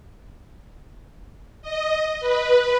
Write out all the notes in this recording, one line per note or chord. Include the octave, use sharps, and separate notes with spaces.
D#5
B4